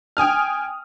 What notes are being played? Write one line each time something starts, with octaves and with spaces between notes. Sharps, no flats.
G5 G#5 D#6 F6